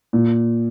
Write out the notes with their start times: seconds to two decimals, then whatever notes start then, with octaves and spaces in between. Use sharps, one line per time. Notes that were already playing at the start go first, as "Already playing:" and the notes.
0.13 A#2